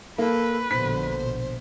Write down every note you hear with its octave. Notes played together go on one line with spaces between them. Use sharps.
A#3 A4 B4
A#1 B2 D3 C5 B6